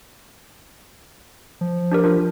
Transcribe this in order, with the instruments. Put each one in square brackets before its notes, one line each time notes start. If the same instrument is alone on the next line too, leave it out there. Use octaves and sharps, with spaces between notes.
[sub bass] F3
[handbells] D4 G4 A#4
D4 F4 A#4